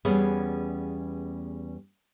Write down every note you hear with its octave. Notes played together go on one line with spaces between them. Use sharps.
E2 G3 B3 C#4 G#4 F5